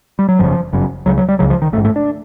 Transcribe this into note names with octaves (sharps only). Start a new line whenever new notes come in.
G3
F#3
G1 F#2 C#3 F3
G1 F#2 C#3
C#2 C#3 F#3
F#3
G3
C#2 C#3 F#3
F3
D#3
A1 G#2 A3
A3
D4